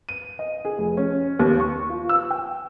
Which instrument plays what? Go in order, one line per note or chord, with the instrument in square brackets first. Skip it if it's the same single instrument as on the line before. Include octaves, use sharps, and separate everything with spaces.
[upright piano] D#7
D#5
G#4
F1
C#4
D#2
C#6
F4
E6
G5